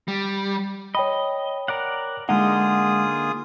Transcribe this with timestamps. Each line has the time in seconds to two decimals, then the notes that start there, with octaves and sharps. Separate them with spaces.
0.08 G3
0.95 C#5 D#5 G5 B5
1.68 A#4 D5 F#5
2.29 D3 G#3 A#3 D#4 F4 G#4 F#5 D#6